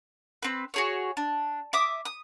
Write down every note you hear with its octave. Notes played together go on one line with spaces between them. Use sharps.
C4 B4
F#4 G#4 C#5
D4
E5 D6 D#6
D#6